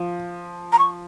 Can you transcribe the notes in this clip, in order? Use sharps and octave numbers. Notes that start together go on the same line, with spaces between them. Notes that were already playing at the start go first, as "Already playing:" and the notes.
Already playing: F3
A#5
C#6